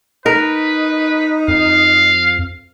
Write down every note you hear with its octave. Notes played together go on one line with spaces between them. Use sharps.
D#4 A#4 B4
F2 F5